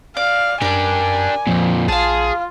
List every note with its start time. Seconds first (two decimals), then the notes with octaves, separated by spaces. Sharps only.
0.17 D5 F5
0.61 F#2 D4 G4 A#4 D5 G#5
1.47 F2 A#2 F3
1.88 A#1 F4 G#4 F5 A5